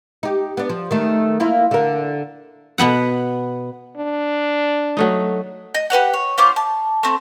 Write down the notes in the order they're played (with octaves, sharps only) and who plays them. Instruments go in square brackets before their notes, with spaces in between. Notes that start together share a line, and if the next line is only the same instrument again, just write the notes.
[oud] D#4 G4
B3 D4
F3
D#3 A3
A#3 E4 F4
D3 A#4
[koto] B2 B3 B4 F#5
[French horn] D4
[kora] F#3 A3 D#4
[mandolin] D#5
G4 B4 C#5 F#5
C#5
C#4 F4 C5 D6
A5
A3 C4